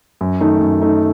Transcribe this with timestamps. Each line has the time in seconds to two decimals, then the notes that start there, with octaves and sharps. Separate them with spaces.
0.21 F#2
0.41 D#3 A3 D#4
0.61 F#2
0.81 D#3 A3 D#4